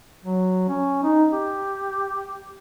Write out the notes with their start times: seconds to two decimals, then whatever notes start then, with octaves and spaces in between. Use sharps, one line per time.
0.24 F#3
0.68 C#4
1.03 D#4
1.33 G4